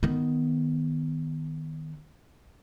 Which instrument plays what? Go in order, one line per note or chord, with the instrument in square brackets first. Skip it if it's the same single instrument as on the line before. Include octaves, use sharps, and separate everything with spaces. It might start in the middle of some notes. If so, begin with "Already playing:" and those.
[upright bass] D#3 B3